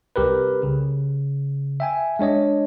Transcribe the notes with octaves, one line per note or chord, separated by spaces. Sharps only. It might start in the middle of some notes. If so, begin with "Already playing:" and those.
C2 G4 A#4 B4
C#3
E5 G5 G#5
G#3 D4 C#5 D#5